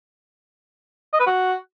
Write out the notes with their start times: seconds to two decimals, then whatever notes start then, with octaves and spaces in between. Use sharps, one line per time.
1.13 D#5
1.20 B4
1.26 F#4